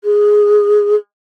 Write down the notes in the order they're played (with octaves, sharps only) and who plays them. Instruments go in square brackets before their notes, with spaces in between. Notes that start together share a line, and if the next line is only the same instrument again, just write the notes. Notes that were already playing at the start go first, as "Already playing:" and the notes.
[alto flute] G#4